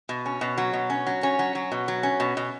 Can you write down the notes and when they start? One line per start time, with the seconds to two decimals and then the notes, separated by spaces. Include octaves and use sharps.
0.09 B2
0.26 C#4
0.41 B2
0.58 F#3
0.73 B2
0.90 C#4
1.07 F#3
1.23 C#4
1.39 F#3
1.55 F#3
1.72 B2
1.88 F#3
2.03 C#4
2.20 B2
2.37 B2